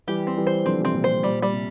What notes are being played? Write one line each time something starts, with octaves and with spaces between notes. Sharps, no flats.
E3 G3 G4
C4
E3 G3
C5
D3 F3 C4
C3 E3 C4
A#2 D3
C3 C5
A#2 G3
G3
C3